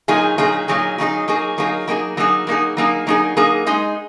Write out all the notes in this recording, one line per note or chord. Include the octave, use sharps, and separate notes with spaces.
A#2 F#3 D#4 G#4
A#2 F#3 D#4 G#4
A#2 F#3 D#4 G#4
A#2 F#3 D#4 G#4
F#3 A#3 D#4 G#4
F#3 A#3 D#4 G#4
F#3 A#3 D#4 G#4
F#3 A#3 D#4 G#4
F#3 A#3 D#4 G#4
F#3 A#3 D#4 G#4
F#3 A#3 D#4 G#4
F#3 A#3 D#4 G#4
G#3 D#4 G#4